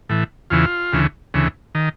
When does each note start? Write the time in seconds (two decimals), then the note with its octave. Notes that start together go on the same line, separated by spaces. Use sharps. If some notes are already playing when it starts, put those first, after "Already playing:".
0.09 A2 E3
0.50 E2 C#3 E3 F4
0.93 D2 C#3 E3
1.34 D2 C#3 E3
1.75 D#3